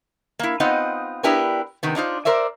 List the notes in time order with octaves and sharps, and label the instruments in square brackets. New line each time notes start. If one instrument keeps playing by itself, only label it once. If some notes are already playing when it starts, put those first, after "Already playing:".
[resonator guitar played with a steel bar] A#3 E4
B3 C4 D#4 F4 D#5 F#5
B3 D4 E4 G4 A#4 B4
C3 D#3 B3
D4 D#4 F4 C5
A#4 C5 D5 E5